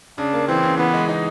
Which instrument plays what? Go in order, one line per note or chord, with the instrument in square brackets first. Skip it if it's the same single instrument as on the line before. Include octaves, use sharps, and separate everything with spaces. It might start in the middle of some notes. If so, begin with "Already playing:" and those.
[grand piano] C#3 [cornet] D4
[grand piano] A#3
[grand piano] E3 [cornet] C4
[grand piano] C#3
[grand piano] E3 [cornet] B3
[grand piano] G#3
D#4